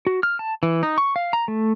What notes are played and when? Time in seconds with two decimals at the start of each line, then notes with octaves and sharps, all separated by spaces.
0.07 F#4
0.23 F6
0.39 A5
0.63 E3
0.83 D#4
0.98 C#6
1.16 F5
1.33 A#5
1.48 A3